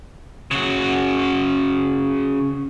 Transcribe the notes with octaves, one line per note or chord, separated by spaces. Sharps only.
C#3 F#4